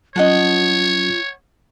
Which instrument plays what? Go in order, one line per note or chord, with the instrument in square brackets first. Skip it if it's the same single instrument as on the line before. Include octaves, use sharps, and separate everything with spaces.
[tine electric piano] F#3 C#4 [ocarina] F4 [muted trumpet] C#5 [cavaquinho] D#5 F#5 A5